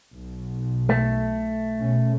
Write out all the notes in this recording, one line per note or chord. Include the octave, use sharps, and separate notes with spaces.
B1
A3
B2 C#4